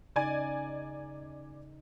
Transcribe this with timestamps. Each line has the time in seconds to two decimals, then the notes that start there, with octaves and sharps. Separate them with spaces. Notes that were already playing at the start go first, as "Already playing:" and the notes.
0.16 C#3 D#4 D5 G#5